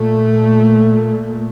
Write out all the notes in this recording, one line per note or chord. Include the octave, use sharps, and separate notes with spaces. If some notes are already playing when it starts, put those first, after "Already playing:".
Already playing: A#2 A3